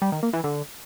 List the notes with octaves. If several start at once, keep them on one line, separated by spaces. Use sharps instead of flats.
G3
D#3
A#3
E3
D3